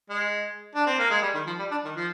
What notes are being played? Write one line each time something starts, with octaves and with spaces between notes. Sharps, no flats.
G#3
D4
C4
A#3
G#3
G3
D#3
F3
G3
D4
D#3
F3